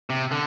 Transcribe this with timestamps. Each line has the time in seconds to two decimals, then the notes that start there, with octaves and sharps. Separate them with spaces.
0.10 C3
0.31 D3